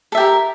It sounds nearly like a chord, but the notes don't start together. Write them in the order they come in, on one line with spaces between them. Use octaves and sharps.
A4 E5 G4 A#4